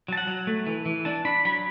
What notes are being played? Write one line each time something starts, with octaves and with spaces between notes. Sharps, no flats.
F#3 A5
F#5
F#3
A3
E3
E3
D4 A5
D4 B5
F#3 B5